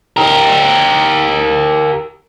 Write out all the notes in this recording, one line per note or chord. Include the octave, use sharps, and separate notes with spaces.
G4 A#4